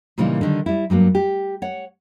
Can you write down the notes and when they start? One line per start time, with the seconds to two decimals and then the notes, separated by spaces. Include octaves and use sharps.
0.18 A#2 C#3 E3 G3 A#3 D#4
0.41 D3 D#3 G3
0.66 G3 E4
0.90 G2 F#3 A3 A#3
1.15 G4
1.62 C#5 F#5